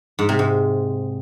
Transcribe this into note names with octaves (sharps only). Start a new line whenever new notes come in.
G#2
C3
G#2